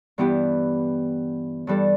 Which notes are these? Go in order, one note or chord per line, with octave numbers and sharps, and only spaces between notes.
G2 E3 B3 E4 G4
G2 E3 G3 D4 A4